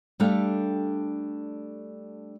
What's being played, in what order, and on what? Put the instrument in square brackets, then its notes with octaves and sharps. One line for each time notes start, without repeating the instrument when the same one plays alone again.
[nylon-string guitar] G3 A3 D4 G4 A4 F5